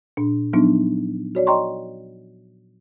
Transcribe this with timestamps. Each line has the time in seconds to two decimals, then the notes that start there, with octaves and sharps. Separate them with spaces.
0.17 A#2 D4
0.53 F3 F#3 B3 D4 D#4
1.35 F#4 C#5 D5
1.47 D5 D#5 G5 A#5 C6 C#6